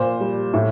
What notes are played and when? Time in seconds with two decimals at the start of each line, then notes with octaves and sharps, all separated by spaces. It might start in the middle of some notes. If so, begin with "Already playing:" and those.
Already playing: A#2 C5
0.20 G3
0.54 A2